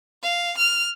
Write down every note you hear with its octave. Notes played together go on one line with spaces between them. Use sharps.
F5
F6